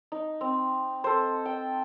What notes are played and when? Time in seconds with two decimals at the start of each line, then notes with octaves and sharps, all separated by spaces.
0.12 D#4
0.41 C4
1.04 A4 C5
1.45 G5